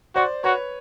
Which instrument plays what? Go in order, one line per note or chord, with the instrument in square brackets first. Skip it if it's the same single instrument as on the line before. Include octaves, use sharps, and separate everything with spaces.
[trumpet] F#4 [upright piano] C5 D5
[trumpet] F#4 [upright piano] B4 C#5